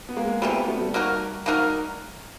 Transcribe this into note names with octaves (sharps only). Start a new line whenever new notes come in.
B3
G#3 A#3
C3 E3 G3 A3 B3
A#3 C4
A3 B3
G3 A3
A#3 D#4 F#4 A#4
A#3 D#4 F#4 A#4